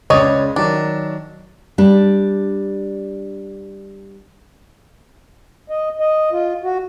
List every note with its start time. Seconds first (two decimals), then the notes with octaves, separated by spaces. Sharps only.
0.10 C#2 C#3 D4 C#5 D#5
0.56 D#3 F#3 D4
1.78 G3 D4
5.70 D#5
6.00 D#5
6.32 F4
6.63 F#4